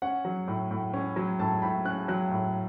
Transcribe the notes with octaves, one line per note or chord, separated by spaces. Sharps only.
C#4 F#5
F#3
A2
A2
C#4
F#3
A2 A5
A2 B5
C#4 F#6
F#3 F#6
A2